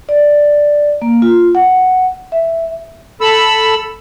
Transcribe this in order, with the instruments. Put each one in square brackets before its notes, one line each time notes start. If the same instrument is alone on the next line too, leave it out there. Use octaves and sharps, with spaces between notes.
[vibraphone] D5
A#3
F4
F#5
E5
[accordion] A4 B5 E6